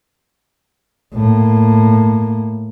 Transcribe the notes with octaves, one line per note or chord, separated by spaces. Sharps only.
A2 A#3